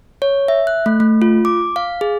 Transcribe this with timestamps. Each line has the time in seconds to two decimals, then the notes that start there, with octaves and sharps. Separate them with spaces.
0.22 C#5
0.48 E5
0.67 F#6
0.86 A3
1.00 A3
1.22 F4
1.45 D6
1.76 F5
2.01 G#4